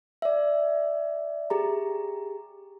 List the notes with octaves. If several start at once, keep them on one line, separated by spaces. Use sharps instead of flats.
D5 E5
G4 G#4 A#5